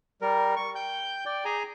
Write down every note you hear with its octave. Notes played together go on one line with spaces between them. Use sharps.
G3 A#4
C#6
G5 G6
D5 G5
G#4 G#5 A#5